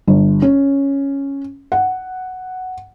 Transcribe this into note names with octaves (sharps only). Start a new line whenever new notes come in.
G1
C#4
F#5